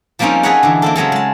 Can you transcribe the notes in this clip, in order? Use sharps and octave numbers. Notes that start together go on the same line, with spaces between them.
F3 G3 A#3 C4 C#4 D#4
G#4 A4 B4 C#5 F#5 A#5
D3 E3
A#3 C4 A4
C#3 F#3 G#3 A4
G#3 A5